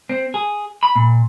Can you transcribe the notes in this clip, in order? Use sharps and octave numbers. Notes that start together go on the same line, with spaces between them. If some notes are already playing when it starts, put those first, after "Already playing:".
C4
G#4
B5
A#2